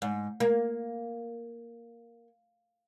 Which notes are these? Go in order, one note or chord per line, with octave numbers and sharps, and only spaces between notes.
G#2
A#3